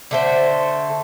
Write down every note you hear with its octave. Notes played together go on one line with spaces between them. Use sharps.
D3 A3 C5